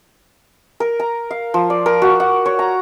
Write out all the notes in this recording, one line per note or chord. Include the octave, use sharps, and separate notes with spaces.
A#4
A#5
F5
F3
D5
A#4
F#4
F#5
C#5
A#5